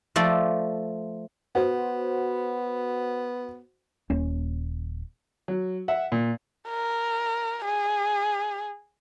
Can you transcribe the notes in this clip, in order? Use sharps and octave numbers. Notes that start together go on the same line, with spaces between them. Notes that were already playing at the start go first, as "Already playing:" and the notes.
F3 A3 D5
B3 F#4 C5
D#1 A#3 C#4
F#3
E5 F#5
A#2
A#4
G#4